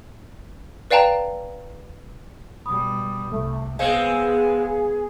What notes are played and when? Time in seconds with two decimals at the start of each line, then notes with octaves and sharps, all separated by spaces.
0.91 B4 D5 F5 G5 A5 A#5
2.66 B2 G3 B5 D#6
3.31 C2 C3 A3
3.79 G#3 B3 C4 G#4 F5 C#7